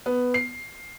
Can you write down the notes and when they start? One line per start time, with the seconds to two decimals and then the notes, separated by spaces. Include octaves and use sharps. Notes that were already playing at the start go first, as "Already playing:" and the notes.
0.06 B3
0.34 C7